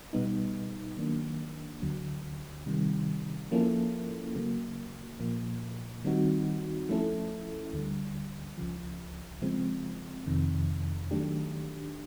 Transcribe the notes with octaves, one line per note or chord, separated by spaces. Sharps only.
B2 G3 B3 D#4
D#3 F#3 A#3 D4
D2 D3 F#3
C3 D#3 G3
F3 A#3 C#4 E4 A4
C#3 F#3 A#3
A#2 F3 A#3
D#3 G3 C4 D#4 F#4
F3 A3 C#4 E4 A4
D2 D3 G3
C#2 C#3 F3
C#3 F3 G#3 C4
F2 C3 D#3
D#3 F#3 A3 D4 G4